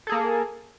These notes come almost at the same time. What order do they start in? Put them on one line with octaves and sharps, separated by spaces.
A4 G#4 A#3